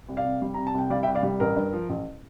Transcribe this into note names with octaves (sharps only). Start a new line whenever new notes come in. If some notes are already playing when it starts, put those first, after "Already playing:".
C2
D5 F5
C3
G3
C3 A#5
A5
C2 G5
G3 D5 F5
E5 G5
C2
D5 F5
G3
A1 A#4
G2
F3
A1